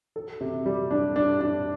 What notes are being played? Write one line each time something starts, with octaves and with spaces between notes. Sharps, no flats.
A4
C3
G3
D4
D4
D4